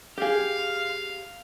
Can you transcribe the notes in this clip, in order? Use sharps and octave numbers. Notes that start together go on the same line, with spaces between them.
G4 G#4 F5